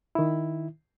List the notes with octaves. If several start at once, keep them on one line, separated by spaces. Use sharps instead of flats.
D#3 E4